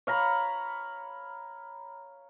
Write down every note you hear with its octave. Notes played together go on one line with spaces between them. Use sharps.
C#5 F5 A#5 B5